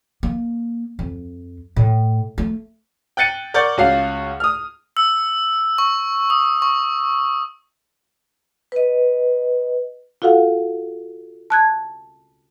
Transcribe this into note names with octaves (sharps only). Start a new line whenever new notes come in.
A#3
F2
A2
A3
G5 F#6 A6 C#7 D#7
A#4 D5 F#5 C#6 G6 A6
C#2 C#4 F#4 F5 C7
D#6 F6
E6
C#6
D#6
C#6
B4 D#5
F4 F#4 A4 F5 F#5
A5 F#6 G#6